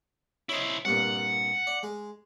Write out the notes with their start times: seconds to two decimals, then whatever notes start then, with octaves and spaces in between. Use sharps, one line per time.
0.49 E4 C5 C#5 D#5
0.85 C2 G2 A#2 F#5
1.67 D5
1.83 G#3